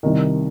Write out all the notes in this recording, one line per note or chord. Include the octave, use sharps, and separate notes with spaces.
C2 C3 D#3